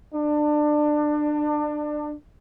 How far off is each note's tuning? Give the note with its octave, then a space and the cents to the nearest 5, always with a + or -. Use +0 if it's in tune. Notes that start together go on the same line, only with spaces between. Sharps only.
D4 +25